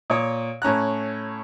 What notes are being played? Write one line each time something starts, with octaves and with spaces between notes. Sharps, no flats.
A#2 C#5 D#6
A2 C#4 A#5 F#6